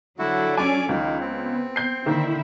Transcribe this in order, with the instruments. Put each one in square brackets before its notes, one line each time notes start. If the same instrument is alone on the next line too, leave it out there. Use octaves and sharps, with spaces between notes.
[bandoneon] D3 E4 F#4 [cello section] F#3 D4 A4
[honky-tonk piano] C#4 G#5 [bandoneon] D5 D6
[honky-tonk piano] C#2 [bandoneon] D#3 A#3
[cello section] B3 [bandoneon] C4
[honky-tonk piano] G6 C7
[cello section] D3 E4 E5 [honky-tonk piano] D#3 A#3